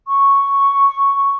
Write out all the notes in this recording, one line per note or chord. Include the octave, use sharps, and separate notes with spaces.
C#6